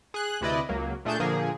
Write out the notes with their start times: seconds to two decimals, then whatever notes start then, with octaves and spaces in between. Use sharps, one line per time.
0.14 G#4 F#6
0.41 D2 C3 E4 B4 D5 D#5
0.69 C#2 F#3 A#3
1.05 A#2 A3 D4 G#4 A5 G6
1.20 A#2 D3 F3 A#3 G#4